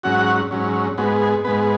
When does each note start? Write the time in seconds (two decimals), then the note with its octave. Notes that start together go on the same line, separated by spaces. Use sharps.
0.03 G#2 F#3 C#4 F#4 F#5
0.51 G#2 F#3 C#4
0.98 G#2 G#3 B3 F#4
1.22 G#4
1.44 G#2 G#3 B3 B4